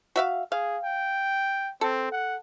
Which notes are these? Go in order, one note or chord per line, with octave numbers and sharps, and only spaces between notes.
F#4 E5 F5
G#4 F5
G5
C4 A4
F#5